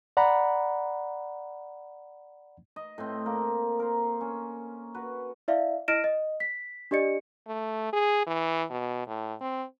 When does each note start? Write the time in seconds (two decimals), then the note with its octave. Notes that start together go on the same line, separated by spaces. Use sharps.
0.17 D5 F#5 A#5 B5
2.76 D#5
2.98 A2 C4
3.26 A#3
3.79 A#4 C5
4.21 C#4
4.95 F#4 B4
5.48 E4 D5 E5 F5
5.88 E4 D#5 F6 A#6 D7 E7
6.04 D#5
6.40 B6
6.91 D4 G4 D5 D#5 C#7
7.48 A3
7.93 G#4
8.27 E3
8.71 B2
9.07 A2
9.41 C4